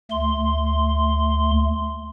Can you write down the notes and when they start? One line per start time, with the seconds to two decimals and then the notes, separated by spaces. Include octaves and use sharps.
0.11 D2 A3 C6